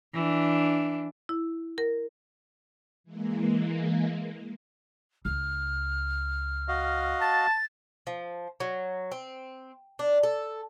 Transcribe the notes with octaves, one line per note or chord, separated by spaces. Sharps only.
E3 D4
E4
A#4
E3 G#3 A#3
C#2 F6
F#4 D#5 F5
A5 A6
F3
F#3
C4
D4
A4